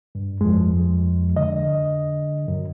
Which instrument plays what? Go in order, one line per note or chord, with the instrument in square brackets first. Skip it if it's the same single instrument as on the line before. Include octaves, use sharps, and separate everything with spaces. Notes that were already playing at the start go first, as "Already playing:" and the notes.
[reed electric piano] G2
[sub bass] F2 [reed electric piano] F3 G#3
[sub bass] D3 [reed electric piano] D#5
[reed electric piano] F#2